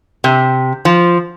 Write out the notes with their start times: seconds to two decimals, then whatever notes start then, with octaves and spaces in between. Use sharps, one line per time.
0.24 C3
0.85 F3